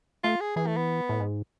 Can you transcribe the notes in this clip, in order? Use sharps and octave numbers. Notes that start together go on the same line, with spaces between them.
A3 F4
G#4
E3 G#4
A3
B3
A2
G#2